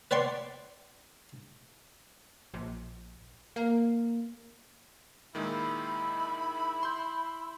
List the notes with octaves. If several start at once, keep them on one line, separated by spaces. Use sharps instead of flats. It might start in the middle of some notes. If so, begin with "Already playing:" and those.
B4 C#5 D5 G5 C6 C#6
A#1
A#3
A#2 D#3 G#3 E4 B5
C6 G6